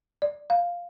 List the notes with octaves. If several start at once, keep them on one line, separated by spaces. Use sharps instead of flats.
D5
F5